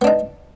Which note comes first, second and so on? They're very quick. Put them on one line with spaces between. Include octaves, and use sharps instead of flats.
B3 D4 D#4